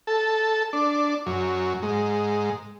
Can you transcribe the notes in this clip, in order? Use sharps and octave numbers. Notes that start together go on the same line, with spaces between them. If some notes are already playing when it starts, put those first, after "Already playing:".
A4
D4
F#2
G#2